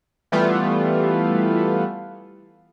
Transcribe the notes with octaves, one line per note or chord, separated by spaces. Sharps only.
E3 G3 A3 B3 F4